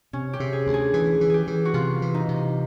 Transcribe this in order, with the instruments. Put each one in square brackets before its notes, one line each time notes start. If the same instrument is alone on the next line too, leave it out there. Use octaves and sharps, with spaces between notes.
[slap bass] C3 [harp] C#4
[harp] G4
[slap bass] C3
[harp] G#4
[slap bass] D2
[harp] G#4
[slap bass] E3 [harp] G#4
[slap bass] E3
[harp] G4 G#4
[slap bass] E3
[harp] F#4
[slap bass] C3 [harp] F4
[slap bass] E3
[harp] D#4
[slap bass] C3